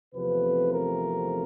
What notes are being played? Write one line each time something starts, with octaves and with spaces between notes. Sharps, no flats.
E2 C3 F3 A3 C4 B4
A#4